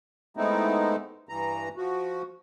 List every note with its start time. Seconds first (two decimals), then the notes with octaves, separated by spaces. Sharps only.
0.37 G#3 A3 B3 C4 D#4 E4
1.29 G2 E3 A#5
1.77 F3 F#4